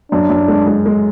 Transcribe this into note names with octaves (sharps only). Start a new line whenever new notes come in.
F#2 D4
F#2
G#3
G#3
G#3